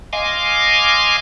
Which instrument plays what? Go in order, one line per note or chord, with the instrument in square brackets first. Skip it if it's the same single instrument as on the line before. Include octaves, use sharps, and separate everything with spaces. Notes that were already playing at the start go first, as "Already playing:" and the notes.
[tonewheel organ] D#5 F5 G#5 C6 D6